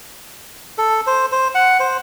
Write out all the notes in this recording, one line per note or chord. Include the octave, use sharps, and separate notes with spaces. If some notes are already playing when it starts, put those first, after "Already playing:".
A4
C5
C5
F#5
C5